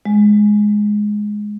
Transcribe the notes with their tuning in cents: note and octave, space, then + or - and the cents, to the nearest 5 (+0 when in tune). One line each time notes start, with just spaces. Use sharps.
G#3 +5